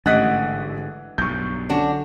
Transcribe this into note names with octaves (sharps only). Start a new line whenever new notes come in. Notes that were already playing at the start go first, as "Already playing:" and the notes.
A1 G#2 D3 E3 D#5 F#5 F#6 B6
B1 G2 C#6 G6
D3 C#4 D4 F#4